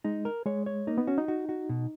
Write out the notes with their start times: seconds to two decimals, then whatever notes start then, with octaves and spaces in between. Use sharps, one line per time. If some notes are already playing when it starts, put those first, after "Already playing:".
0.04 G#3 D#4
0.25 A#4
0.46 G#3 C#5
0.66 C#5
0.87 A#3 D#4
0.98 B3
1.07 C#4 F#4
1.18 D#4
1.28 F#4
1.49 F#4
1.69 B2